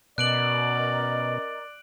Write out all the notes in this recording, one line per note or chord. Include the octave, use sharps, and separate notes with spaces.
B2 C#4 A#4 D5 D#5 F#6 D7 F#7